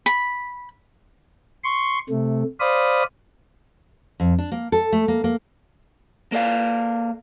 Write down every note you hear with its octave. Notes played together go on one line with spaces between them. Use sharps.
B5
C6 C#6
C3 A3
C5 D5 F5 B5 D#6
F2
D4
A#3
A4
A3
A#3
A#3
A#3 A4 D5 F5